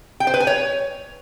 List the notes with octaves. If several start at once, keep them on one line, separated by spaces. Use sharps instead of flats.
G5
C5
B4
G#5
C#5